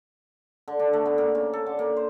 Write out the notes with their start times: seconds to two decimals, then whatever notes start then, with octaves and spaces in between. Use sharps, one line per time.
0.68 D3
0.79 D4
0.93 A3
1.06 B3
1.18 A#3
1.35 C#3
1.53 A4
1.66 D3
1.79 A#3
1.96 C5